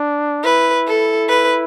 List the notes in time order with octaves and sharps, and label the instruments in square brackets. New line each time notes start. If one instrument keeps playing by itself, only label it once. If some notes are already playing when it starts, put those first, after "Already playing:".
Already playing: [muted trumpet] D4
[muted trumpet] E4 [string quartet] B4
[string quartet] A4
B4